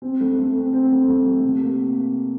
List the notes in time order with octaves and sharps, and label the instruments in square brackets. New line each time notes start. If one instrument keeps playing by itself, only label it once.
[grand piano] C4
A3
A3
C4
C4
A3
A3
A3
C3
A#3